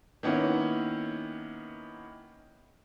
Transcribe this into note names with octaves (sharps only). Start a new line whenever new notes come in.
D#3 A#3 B3 C#4 E4